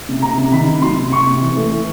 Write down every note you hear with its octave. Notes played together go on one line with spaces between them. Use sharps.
C3
C3 A#5
C3
D#3 B5
C3
F#3 C6
C3
C3 C#6
C3
E3
A3
E3